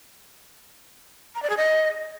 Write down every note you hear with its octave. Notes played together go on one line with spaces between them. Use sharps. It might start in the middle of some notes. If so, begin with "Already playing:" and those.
A#5
D5
G#4
D#5